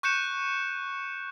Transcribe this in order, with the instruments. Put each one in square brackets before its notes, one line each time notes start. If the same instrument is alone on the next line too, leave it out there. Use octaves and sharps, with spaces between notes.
[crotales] C#6 F#6 G6 C#7 E7